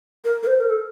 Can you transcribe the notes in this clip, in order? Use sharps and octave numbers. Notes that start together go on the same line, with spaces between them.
A#4
A#4
C5
A#4
A4